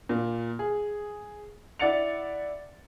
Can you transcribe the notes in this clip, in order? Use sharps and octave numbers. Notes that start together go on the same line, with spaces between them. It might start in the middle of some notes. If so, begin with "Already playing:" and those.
A#2
G#4
E4 D5 F#5 A6 C#7 F7